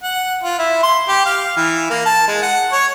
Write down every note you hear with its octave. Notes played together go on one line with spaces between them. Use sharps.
F#5
F4
E4
C6
G4
F5
E3
A#3
A5
G#3
F#5
C#5